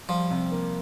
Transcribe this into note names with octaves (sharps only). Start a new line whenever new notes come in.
F3 G3
C3
A#3